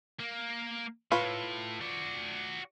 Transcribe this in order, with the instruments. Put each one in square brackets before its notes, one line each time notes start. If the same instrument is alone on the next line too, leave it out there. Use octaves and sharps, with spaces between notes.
[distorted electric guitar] A#3
[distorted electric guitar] A2 [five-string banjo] F4 B4 C#5
[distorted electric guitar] F#4 D5